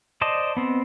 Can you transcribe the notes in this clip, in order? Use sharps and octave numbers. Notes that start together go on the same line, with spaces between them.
C5 D5 D#5 A5
B3 C4